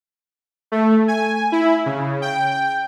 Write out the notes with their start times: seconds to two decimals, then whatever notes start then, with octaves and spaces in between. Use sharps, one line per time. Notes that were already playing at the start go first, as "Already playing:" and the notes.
0.72 A3
1.08 G#5
1.52 E4
1.86 C#3
2.22 G5